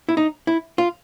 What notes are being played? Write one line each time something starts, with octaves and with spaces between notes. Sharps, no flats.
E4
D#4
E4
F4